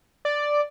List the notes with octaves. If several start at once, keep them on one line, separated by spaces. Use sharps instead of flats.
D5